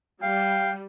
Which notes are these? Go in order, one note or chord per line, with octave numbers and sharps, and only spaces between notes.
G3 F5 G5